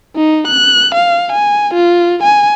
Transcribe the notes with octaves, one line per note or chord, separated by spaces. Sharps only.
D#4
F#6
F5
G#5
F4
G#5